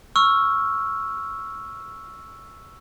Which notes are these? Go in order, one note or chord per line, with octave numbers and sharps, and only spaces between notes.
C#6 E6 F6